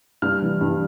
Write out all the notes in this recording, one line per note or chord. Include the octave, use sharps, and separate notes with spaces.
G2 F6
E3
G2